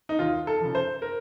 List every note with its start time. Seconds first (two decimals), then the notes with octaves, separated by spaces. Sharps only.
0.09 D#4
0.19 D#2 F4
0.47 A4
0.60 C#3 F3
0.75 C5
1.02 A#4